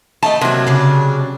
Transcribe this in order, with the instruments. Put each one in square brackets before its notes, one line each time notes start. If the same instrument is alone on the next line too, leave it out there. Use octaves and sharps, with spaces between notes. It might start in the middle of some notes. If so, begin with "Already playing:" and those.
[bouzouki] A3 D#4 D#5 [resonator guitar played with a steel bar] A5
[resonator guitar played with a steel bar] C3 F#3 [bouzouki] A#3
[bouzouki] C#3 D4